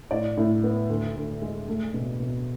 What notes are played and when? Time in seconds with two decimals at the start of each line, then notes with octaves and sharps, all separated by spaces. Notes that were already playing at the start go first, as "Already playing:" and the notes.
0.11 A2 D5
0.37 A2
0.64 B3
0.90 D2
1.16 D2
1.42 G#3
1.68 A3
1.94 B2
2.20 B2